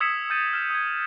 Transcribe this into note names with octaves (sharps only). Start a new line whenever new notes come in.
D#6 E6 G#6 B6 C#7 E7
E6 G6 A6 D#7
F6 E7
D#6 G#6